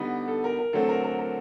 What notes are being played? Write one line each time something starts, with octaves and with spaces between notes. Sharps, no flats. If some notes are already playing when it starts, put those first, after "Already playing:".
Already playing: D3 G3 B3 D#4
A4
A#4
A#4
D3 F#3 A3 C4 A4
A#4
A#4
A#4